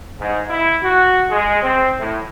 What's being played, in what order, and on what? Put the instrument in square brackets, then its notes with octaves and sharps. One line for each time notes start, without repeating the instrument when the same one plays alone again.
[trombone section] G#2
E4
F#4
G#3
C4
A2